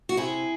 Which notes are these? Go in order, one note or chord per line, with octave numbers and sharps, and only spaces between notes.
F#4
C3 E4 G#4